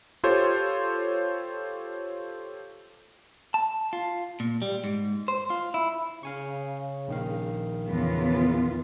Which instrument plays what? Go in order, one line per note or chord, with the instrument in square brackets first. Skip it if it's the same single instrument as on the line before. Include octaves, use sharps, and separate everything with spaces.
[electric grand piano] F4 G4 A4 C5 C#5
[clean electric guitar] A5
F4
A#2
G3
G#2
C5
F4
E4
[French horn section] C#3 [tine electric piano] F5 G#5 C#6
[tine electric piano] A#1 D#3 F5
[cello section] E2 B3 F4 [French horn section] C#3